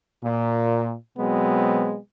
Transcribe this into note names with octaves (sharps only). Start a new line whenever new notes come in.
A#2
B2 F#3 G#3 B3 C4